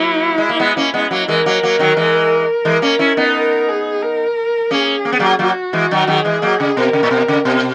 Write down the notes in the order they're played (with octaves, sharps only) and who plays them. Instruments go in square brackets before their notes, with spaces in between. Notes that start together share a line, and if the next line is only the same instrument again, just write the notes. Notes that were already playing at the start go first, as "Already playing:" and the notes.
Already playing: [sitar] F#3 A#3 [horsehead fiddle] E4
[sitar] G#3
A#3
G#3 B3
A#3 C#4
G#3 B3
F#3 A#3
[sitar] E3 G#3 [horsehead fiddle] A#4
[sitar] F#3 A#3
F#3 A#3
D#3 F#3
E3 G#3
E3 G#3
A#3 C#4
C#4 E4
B3 D#4
[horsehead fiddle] A#4
G#4
A#4
[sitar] A#3 C#4 [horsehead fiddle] G#4
[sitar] A#3
B3
F#3 A#3
[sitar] F#3 A#3 [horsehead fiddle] F#4
[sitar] E3 G#3
D#3 F#3
[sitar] D#3 F#3 [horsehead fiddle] G#4
[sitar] E3 G#3
F#3 A#3
C#3
[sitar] B2 [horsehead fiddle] A#4
[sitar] C#3
A#2
B2
C#3
B2